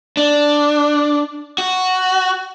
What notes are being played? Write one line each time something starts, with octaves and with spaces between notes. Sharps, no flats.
D4
F#4